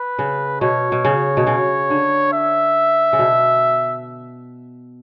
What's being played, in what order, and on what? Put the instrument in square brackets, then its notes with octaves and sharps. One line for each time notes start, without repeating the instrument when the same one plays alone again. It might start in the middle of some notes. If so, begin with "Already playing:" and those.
Already playing: [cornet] B4
[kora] C#3
[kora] B2 [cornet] C#5
[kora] B2
C#3
B2
C#3
D3
[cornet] E5
[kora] C#3
B2